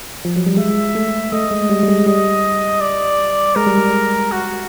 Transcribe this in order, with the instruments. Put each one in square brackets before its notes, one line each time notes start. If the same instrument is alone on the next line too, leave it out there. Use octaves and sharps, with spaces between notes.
[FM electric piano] F3
F#3
G3
[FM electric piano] G#3 [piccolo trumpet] E5
[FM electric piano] A3
[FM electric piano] A3 [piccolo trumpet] D#5
[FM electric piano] G#3
G3
G3
G#3
[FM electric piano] G3 [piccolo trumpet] D#5
[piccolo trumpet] D5
[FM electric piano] G#3 [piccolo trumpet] A#4
[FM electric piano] G3
G#3
[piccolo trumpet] F#4